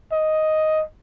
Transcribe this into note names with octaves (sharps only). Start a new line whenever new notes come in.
D#5